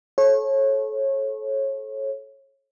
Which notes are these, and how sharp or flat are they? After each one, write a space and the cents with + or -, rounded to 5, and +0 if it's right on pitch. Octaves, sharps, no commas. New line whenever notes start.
A4 -30 C#5 -30